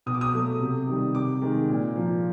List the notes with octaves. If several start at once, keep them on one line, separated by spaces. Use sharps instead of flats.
B2 D#6
D6
D#6
F#3 A3
C3
D#3 G3
C3 D6
D#3 G#3
A#2
F3 A#3